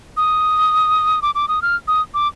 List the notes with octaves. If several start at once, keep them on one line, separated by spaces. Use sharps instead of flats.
D#6
D6
D6
D#6
F6
D#6
D6